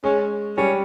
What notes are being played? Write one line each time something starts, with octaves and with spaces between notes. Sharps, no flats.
G#3 C#4
G3 C#4